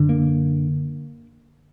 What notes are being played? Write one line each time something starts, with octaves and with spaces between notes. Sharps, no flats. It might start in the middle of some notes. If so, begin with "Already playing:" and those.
Already playing: F#2 D3
A#3